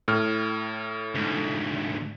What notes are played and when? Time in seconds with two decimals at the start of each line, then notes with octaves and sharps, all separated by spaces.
0.08 A2 F6
1.15 D2 G#2